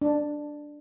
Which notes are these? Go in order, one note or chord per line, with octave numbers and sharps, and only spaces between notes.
D4